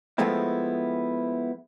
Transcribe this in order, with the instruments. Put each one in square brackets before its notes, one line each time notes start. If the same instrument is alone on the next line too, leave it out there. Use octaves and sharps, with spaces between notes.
[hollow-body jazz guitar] F3 G#3 A3 B3 C4 E4